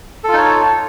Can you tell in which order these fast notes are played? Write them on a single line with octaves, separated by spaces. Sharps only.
A4 F4 D#4 C#5